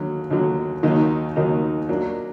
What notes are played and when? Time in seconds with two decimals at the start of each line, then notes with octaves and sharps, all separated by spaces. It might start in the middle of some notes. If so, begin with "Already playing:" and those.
Already playing: D#2 D3 F#3
0.31 D#2 D3 F#3
0.83 D#2 D#3 F#3 A#3 D#4
1.36 D#2 D#3 F#3 A#3 D#4
1.89 F#3 A#3 D4